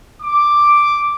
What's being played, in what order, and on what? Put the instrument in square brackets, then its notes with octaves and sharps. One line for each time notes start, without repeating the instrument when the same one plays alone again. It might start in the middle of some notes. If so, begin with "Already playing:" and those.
[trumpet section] D6